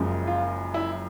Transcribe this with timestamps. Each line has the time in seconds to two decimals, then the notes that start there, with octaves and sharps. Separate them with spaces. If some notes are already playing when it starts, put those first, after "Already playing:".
Already playing: F#1 F#2 C#3 F3 G#3
0.27 F4
0.74 E4